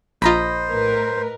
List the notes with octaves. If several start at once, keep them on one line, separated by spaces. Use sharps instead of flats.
A#1 F4 C5 D#5 A#5 B5
A2 A#4 B4